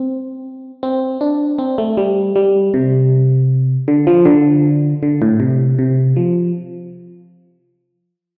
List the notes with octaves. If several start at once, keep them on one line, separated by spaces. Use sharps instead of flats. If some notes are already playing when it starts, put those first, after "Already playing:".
Already playing: C4
C4
D4
C4
A3
G3
G3
C3
D3
F3
D3
D3
A2
C3
C3
F3